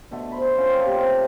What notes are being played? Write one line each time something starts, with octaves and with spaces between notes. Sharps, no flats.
B2 D3 A3
C5 B5
C4 C#4 F4 F5
A#3 F4 G4 A4
C3 A3